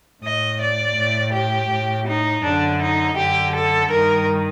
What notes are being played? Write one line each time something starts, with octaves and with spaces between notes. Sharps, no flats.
A2 D#5
D5
A2
G4
A2
D#4
F#2 D3 D4
D#4
F#2 D3 G4
A4
G2 D#3 A#4